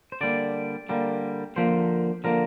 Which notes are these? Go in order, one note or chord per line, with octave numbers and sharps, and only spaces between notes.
C5
D3 G3 A#3 D5
D3 G3 A#3
D3 F3 A#3 C5
D3 F3 A#3 A#4